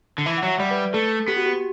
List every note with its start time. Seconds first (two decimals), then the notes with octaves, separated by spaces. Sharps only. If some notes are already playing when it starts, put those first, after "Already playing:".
0.18 D3
0.26 E3 E5
0.38 F#5
0.43 F#3
0.48 E5
0.60 G3 D5
0.71 B4
0.94 A3 A4
1.28 B3 G4
1.37 F#4
1.46 G4